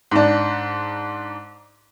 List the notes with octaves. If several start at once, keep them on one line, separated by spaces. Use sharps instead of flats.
G#2 D4